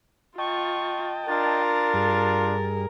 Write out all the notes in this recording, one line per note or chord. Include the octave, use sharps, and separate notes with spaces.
F4 D#5 G5 A5 C#6
D4 F4 A#4 A6
G2 G#4